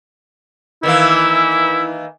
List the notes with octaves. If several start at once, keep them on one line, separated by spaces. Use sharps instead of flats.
D#3 E3 A#3 E4